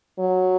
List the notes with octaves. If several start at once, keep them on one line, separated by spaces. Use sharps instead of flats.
F#3